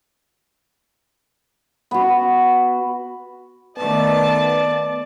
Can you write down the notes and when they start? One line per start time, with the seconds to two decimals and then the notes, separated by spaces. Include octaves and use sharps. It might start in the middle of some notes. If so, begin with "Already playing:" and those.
1.91 B3 F#4
3.77 D#3 A3 B3 D5 A5